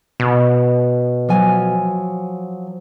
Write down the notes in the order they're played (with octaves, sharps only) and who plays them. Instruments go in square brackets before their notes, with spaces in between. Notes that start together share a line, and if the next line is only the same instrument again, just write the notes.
[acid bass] B2
[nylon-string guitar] F3 F#3 G#5